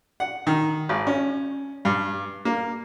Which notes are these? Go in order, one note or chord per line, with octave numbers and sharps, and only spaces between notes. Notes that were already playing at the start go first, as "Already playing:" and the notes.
F#5
D#3
G#1
C#4
G2
A#3